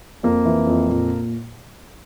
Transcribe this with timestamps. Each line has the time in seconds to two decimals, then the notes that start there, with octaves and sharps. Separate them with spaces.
0.23 F2 A#3
0.45 E3
0.67 F2
0.89 A#2